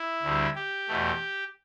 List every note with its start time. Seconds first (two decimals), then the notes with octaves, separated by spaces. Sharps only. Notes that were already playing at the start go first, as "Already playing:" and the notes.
Already playing: E4
0.23 D2 D3 G3
0.56 G4
0.88 E2 B2 A3